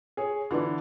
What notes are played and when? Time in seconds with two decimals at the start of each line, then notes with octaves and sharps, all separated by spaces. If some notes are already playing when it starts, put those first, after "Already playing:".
0.17 G#4 C#5
0.51 D3 E3 B3 D4